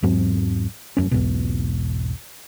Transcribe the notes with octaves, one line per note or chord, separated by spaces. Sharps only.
E2 G#2 F#3 C4
F1 F#2 C#4
B1 E2 G#2 B2